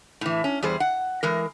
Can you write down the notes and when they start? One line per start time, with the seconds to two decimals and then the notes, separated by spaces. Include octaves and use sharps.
0.21 A2 E3
0.44 C#4
0.63 E2 G3 G#4 C5
0.80 F#5
1.23 E3 G#3 A#4